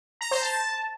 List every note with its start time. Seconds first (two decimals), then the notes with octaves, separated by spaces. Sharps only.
0.21 A#5
0.31 C5
0.42 A5